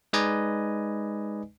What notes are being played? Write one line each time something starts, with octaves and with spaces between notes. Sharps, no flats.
G#3 D#4 B4 D5 D#5 G#5